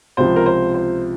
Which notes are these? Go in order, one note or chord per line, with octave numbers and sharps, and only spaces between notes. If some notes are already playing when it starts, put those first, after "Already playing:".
C#2 C3 F3 C5
A#4
C5
C5